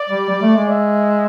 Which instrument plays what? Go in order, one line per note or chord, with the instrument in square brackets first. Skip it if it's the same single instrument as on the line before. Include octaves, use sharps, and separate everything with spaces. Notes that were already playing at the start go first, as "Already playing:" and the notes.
Already playing: [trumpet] D5
[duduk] G3
G3
A3
G#3
[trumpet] E5